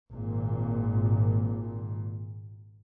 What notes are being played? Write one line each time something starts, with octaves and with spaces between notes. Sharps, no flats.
G#1 A#2